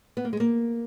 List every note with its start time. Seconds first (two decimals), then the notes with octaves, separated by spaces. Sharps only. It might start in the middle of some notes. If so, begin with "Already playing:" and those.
0.17 B3
0.25 A#3
0.33 G#3
0.40 A#3